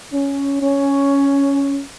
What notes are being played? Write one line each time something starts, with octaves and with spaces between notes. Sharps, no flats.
C#4
C#4